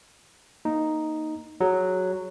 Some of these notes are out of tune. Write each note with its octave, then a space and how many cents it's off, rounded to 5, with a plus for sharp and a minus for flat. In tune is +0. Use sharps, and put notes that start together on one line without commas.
A#3 +0 D#4 +0
F#3 +0 G#4 +0